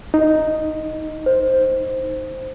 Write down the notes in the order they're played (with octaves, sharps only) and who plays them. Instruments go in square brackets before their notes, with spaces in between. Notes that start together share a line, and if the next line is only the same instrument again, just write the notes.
[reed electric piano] D#4
[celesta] C5